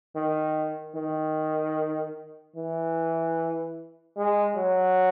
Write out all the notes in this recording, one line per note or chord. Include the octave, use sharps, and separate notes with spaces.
D#3
D#3
E3
G#3
F#3